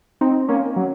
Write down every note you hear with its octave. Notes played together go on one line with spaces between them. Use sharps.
C4 D#4
A#3 C#4
F#3